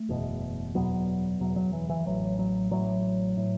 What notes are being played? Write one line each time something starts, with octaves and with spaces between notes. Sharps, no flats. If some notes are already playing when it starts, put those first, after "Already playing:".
Already playing: A3
F#1 E2 B2
F#1 E2 B2 F#3 B3
F#1 E2 B2 F#3
F#3
E3
E3
A1 A2 F#3
F#3
A1 A2 F#3
A2